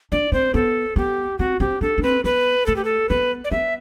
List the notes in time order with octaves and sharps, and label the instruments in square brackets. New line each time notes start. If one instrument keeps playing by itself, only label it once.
[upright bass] D4 [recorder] D5
[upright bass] C4 [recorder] C5
[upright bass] B3 [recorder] A4
[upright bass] B3 [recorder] G4
[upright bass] C4 [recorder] F#4
[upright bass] C4 [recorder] G4
[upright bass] D4 [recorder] A4
[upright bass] D4
[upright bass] C4 [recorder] B4
[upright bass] B3 [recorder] B4
[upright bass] A3 [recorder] A4
[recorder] G4
A4
[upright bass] B3 [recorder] B4
[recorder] D5
[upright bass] B3 [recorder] E5